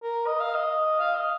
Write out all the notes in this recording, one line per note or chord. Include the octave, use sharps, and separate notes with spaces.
A#4
D#5
F5
D#5
F5
D#5